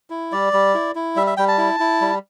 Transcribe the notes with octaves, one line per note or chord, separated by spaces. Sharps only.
E4
G3 D5
G3
E4
E4
G3 E5
E5
G3 G5
A5
E4
E4
G3